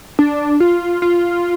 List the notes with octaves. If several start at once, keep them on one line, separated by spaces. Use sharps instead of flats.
D4
F4
F4